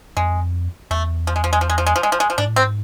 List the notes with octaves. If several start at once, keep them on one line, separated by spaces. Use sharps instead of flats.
F2 G#3
E2 A3
F3
G#3
F3
G#3
F3
G#3
F3
G#3
F3
G#3
F3
G#3
F3
G#2 D4
A2
G#2 C4